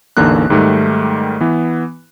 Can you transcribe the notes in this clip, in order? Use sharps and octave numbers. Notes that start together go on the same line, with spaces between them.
A1 E2 D3 A#3 D#4 F#6
G#2 D#3 G3 A3
E3 B3